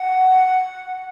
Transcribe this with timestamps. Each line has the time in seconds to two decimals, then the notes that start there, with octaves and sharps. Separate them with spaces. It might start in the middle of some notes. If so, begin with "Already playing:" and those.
Already playing: F#5